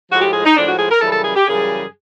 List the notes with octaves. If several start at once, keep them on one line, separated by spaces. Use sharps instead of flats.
A2 F3 G#3 F#4
G4
G#4
D#4
A2 F3 G#3 D4
F#4
G#4
A#4
F#2 C#3 E3 G3 A4
A4
G#4
G4
F#2 C#3 E3 G3 G#4